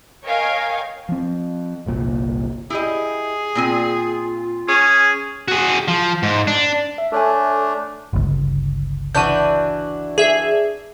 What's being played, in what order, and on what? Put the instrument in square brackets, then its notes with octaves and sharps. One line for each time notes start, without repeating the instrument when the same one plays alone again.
[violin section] A#4 C#5 D#5 F5 G5 G#5
[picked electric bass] F3 C4
G1 C2 A#2
[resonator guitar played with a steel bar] E4 G4 D#5 [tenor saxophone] G#4
[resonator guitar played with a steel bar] A#2 C4 G#5 [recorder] F4
[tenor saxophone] C#4 [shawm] G#4
[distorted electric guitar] F#4 G#4
F3
G#2
D4
[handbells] E5
[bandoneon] A3 D4 [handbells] A4 C#5 G#5
[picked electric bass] G1 C#2
[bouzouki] E3 D4 F#4 [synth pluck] G6 D#7
[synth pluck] G#4 E5